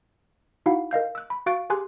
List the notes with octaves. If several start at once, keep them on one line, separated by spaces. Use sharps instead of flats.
D#4 E4 F#4 F5 F#5 B5
A#4 D#5 F5 G6
E6 F#6
B5
F#4 F5 C#6 F#6 A6 D7
G4 G#4 G#5 C6 F#6